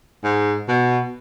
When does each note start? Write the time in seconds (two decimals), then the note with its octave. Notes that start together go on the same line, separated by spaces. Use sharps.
0.24 G#2
0.68 B2